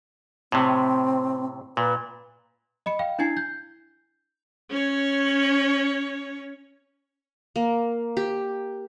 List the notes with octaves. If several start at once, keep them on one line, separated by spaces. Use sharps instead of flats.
A2 C3 C4
A#2 B4
D#5 B5 C#7
F5 G5
D4 E4 G#5 G#6 C7
G6
C#4 C#5
A#3
G4